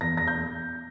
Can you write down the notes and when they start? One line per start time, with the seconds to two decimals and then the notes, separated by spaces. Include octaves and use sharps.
0.01 E2 A#6
0.17 A#6
0.28 G6